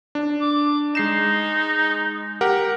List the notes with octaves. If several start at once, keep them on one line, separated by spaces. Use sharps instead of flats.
D4
D6
G#3 D#4 C7 E7
G4 A#4 F#5